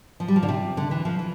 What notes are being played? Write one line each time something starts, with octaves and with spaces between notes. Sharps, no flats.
F3
G3
F3
D3
C3
D3
E3
F3
E3